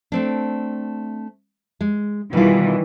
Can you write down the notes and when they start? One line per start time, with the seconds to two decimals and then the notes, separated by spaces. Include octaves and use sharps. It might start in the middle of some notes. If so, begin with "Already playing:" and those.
0.12 A3 C4 D4
1.81 G#3
2.33 B2 D#3 E3 G3 F4